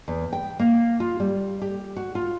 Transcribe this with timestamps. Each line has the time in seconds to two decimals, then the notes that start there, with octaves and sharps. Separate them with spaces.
0.08 E2
0.33 G5
0.59 A#3
1.00 F4
1.20 G3
1.61 G4
1.96 F#4
2.15 F4